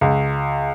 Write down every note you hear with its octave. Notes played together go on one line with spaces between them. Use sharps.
C#2